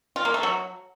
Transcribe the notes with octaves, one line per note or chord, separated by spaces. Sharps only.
F4
A#3
A3
F#3